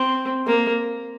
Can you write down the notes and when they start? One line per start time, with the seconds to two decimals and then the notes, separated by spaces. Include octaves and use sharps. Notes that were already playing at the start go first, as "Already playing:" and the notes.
Already playing: C4
0.47 A#3